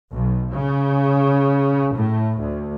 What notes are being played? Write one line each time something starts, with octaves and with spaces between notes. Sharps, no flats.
B1
C#3
A2
D2